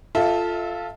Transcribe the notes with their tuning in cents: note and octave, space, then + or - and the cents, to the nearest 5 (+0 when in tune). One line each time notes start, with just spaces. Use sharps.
F4 +0 A4 +0 E5 -30